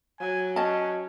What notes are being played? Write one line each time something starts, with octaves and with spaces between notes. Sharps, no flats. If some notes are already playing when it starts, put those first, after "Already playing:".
F#3 G#5
C#4 D#5 A5